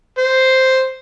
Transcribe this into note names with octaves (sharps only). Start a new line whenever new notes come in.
C5